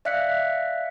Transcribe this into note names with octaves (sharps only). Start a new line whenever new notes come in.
D5 E5 F5 F#6 B6 C#7